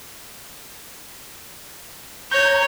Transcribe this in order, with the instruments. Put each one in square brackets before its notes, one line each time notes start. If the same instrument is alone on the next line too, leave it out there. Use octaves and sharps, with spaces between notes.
[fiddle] C#5 [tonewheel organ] A#5 G6